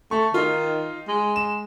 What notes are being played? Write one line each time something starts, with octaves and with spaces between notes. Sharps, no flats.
A3 C#6
D#3 D#4 F4
G#3
E7